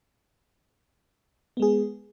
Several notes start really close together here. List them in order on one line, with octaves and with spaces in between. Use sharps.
B3 G#3 G#4